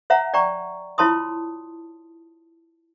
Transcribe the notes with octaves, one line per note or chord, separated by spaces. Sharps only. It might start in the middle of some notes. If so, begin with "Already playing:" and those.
C#5 E5 F#5 A#5
D5 G5 A#5 C#6
E4 F4 C#5 A5 C6 D#6